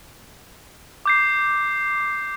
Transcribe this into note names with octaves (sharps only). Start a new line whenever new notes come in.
D6 G6 C7